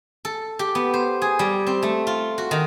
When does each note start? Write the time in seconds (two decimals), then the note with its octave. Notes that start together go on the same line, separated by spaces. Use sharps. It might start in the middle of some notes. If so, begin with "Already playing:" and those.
0.25 A4
0.59 G4
0.75 B3
0.94 C5
1.22 G#4
1.39 G3
1.67 C4
1.83 A3
2.07 F4
2.38 F#4
2.51 D#3